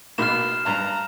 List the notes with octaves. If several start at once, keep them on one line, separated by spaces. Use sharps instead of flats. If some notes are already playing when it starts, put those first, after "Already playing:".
A#1 B2 A#3 F6 E7
G2 A#5